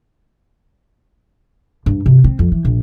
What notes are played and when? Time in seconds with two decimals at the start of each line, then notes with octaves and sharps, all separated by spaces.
1.86 G2
2.06 C3
2.24 C4
2.39 F2
2.52 E3
2.65 A#1